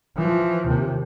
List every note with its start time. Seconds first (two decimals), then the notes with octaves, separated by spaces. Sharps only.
0.16 E3 F3
0.67 D#2 C3